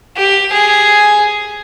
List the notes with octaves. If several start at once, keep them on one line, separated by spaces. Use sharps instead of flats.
G4
G#4